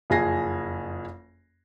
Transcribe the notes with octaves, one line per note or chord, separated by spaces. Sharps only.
F#1 F2 G#4 G#5 A#6 C7